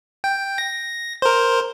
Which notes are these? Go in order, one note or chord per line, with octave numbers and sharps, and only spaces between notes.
G5
A#6
A#4 C5